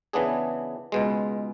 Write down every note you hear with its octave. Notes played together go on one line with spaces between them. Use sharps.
C#3 E3 B3 D4 G#4
C#2 B2 G#3